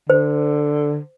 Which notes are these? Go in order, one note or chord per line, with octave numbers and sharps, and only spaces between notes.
D3 C5